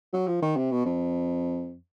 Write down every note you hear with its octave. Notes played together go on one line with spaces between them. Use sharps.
F#3
F3
D#3
C3
B2
F2